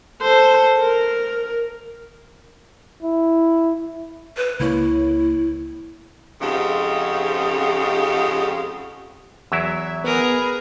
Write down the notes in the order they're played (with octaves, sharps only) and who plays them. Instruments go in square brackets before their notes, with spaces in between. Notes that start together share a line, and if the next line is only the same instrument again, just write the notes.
[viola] A4 C5
A#4
[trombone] E4
[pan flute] B4
[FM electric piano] C#2 A#3 C#5 [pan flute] E4
[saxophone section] F2 G#2 C#3 G4
[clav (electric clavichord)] E2 F#3 E4 [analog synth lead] E5
[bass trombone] B3 [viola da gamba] G#4 A#4 [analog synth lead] B4